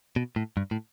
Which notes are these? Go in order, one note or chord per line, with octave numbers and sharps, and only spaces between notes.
B2
A2
G2
A2